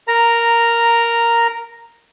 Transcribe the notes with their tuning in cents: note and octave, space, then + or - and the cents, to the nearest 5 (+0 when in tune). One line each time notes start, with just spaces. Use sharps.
A#4 +0 A#5 -5